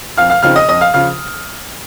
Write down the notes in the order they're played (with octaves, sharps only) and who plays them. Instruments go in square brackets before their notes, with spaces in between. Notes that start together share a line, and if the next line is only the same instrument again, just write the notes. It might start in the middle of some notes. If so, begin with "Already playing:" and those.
[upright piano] F2 F5 F6
F5 F6
C#3 F3 C4 D#4 F5 F6
D#5 D#6
F2 D#5 D#6
F5 F6
C#3 F3 F5 F6